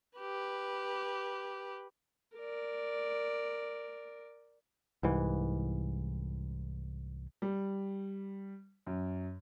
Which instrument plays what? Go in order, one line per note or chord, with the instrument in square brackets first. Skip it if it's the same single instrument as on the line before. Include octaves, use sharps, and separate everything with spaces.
[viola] G4 B4
A#4 D5
[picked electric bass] C2 G#2 E3
[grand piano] G3
F#2